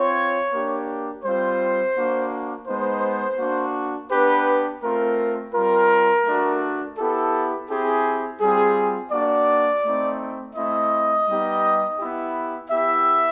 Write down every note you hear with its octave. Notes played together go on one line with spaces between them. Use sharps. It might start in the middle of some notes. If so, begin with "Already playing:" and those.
Already playing: C4 F4 C#5
A#3 D4 G4
G3 C4 F4 C5
A#3 D4 F#4
G#3 B3 D#4 C5
A#3 D4 F#4
B3 D4 G4 B4
A3 C4 F4 A#4
G3 C4 F4 A#4
A3 D4 F#4
B3 E4 G4 A4
C4 E4 G4 G#4
G3 C4 F4 G#4
A#3 D4 F#4 D5
A3 C4 D#4
A3 C4 E4 D#5
G3 B3 D#4 G4
B3 E4 G4
B3 E4 G4 E5